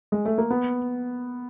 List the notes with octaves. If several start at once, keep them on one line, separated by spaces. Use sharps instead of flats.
G#3
A3
A#3
B3